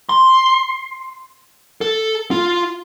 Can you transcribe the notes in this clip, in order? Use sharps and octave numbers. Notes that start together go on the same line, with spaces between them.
C6
A4
F4